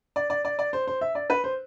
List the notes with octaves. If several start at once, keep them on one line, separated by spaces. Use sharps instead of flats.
D5
D5
D5
D5
C5
C5
E5
D5
B4
C5